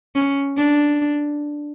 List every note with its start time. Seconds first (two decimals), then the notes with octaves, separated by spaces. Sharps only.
0.15 C#4
0.56 D4